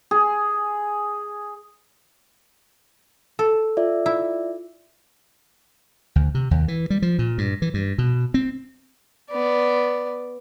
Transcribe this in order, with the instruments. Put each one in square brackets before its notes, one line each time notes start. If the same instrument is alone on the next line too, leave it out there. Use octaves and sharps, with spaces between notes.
[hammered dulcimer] G#4
[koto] A4
[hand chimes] F4 D5 E5
[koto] E4
[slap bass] D2
C3
D#2
E3
G3
F3
A#2
G2
E3
G2
B2
C4
[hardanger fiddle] B3 D5